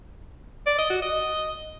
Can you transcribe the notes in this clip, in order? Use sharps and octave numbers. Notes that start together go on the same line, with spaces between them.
D5
D#5
F#4
D#5